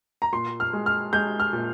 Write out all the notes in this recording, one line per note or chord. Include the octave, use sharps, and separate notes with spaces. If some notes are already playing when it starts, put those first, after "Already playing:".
A#5
A#2 C6
F6
G#3
F6
G#3 G6
F6
A#2